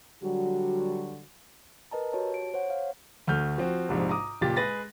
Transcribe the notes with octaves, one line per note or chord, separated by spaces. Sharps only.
D3 F#3 G3 F#4
A#4 B4 D#5 A5 A#5
F#4 G4 C#5 A5
D7
C5 C#5 F#5
F5
D2 A3 F6 G6
F3 C4 F#4
A#1 G#2 C3
A#5 D6 D#6
F#1 A#2 G4 A6
G#3 G#4 B4 A6 A#6